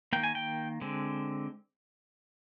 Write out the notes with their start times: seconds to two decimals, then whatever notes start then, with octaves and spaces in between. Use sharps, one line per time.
0.13 D#3 A#3 G5
0.24 G#5
0.35 G5
0.81 D3 G#3 C4